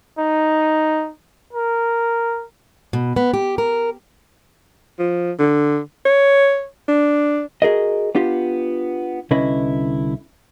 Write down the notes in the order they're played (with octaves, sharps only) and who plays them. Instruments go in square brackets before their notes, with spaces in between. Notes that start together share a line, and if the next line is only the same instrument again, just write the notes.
[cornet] D#4
A#4
[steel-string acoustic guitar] B2
B3
G4
A#4
[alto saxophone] F3
D3
C#5
D4
[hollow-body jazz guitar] F#4 G#4 A#4 D#5
B3 D4 F4 G4
C2 D3 C#4 E4 B4 D#5